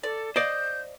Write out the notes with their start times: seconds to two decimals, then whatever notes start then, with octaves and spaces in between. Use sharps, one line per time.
0.03 A4 D5
0.36 C5 D5 D#5 F5 G6